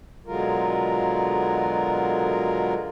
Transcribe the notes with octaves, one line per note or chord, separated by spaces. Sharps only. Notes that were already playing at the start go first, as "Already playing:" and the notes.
B2 D3 F#3 G#3 F4 A#4